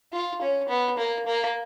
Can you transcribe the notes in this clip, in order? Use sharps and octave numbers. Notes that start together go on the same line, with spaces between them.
F4
C#4
B3
A#3
A#3